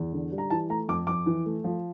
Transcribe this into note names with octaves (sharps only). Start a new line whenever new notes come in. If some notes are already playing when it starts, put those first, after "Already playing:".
Already playing: E2
D3
G3
A#5
E3 A5
A3 A#5
F2 D6
F2 D6
E3
A3
F3